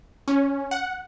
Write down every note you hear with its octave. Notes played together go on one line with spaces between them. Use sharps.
C#4
F#5